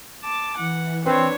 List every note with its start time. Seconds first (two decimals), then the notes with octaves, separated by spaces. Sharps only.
0.24 A5 D6
0.58 E3 F#5
1.06 C4 D4 B4 C#5 C6